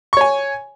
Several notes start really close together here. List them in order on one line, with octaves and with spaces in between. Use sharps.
C#6 C#5 G#5